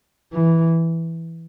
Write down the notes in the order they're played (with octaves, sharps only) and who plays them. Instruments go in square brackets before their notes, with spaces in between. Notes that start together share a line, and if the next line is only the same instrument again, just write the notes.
[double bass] E3